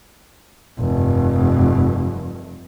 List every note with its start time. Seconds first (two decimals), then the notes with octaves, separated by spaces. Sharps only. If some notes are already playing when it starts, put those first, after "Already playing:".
0.79 F1 G2